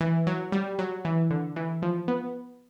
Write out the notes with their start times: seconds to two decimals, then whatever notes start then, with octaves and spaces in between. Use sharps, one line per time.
0.01 E3
0.27 F#3
0.52 G3
0.79 F#3
1.05 E3
1.31 D3
1.56 E3
1.82 F3
2.08 B3